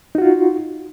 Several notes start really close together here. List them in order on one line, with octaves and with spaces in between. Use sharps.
D#4 F#4 F4